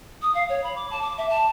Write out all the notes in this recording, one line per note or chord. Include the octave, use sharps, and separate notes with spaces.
D#6
F5
C#5
B5
D6
A5
D6
E5
A5